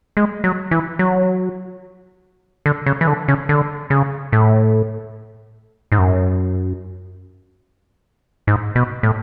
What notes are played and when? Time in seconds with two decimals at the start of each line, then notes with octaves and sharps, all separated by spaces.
0.17 G#3
0.44 F#3
0.71 E3
0.99 F#3
2.66 D3
2.86 C#3
3.01 E3
3.07 D3
3.28 C#3
3.49 D3
3.90 C#3
4.32 A2
5.92 G#2
5.99 F#2
8.47 G#2
8.75 B2
9.03 A2